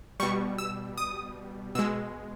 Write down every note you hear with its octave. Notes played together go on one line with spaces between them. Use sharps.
B2 G3 C#6
E6
D#6
B2 G#3 E6